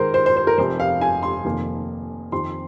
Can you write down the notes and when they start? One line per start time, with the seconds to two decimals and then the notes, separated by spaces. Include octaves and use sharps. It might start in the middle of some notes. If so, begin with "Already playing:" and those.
Already playing: G#2 D#3 G#3 A#4 C5
0.14 C5
0.26 C5
0.37 C5
0.47 A#4
0.58 F1 F2 C3 C5
0.80 F5
1.01 G#5
1.23 C6
1.45 F1 F2 D#3 A#3
2.32 F2 D#3 C4 C6